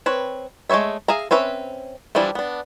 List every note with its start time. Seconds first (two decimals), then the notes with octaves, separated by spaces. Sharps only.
0.06 C4 B4 C#5
0.70 G#3 A3 C5 C#5 E5
1.08 G#4 E5 F5 A#5
1.31 C4 C#4 B4 E5
2.15 E3 F3 G3 D4 E4
2.35 B3 D4